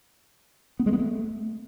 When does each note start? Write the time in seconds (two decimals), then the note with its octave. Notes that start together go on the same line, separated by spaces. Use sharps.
0.79 B3
0.86 G#3
0.93 B3
0.99 A3